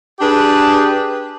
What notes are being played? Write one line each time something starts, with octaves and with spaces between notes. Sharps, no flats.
D4 G4 G#4 B4